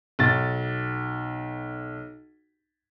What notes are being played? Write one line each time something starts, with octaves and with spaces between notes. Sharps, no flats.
B1 A6